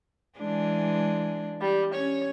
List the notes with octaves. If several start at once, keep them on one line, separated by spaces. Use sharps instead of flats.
E3 G#3 D4
G3
C#4 C#5